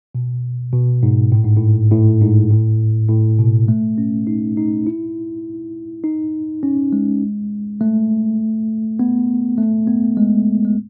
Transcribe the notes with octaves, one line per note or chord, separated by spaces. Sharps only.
B2
B2
G#2
A2
G#2
A2
A2
G#2
A2
A2
B2
A3
C#4
D#4
D#4
E4
D#4
C#4
G#3
A3
B3
A3
B3
G#3
G#3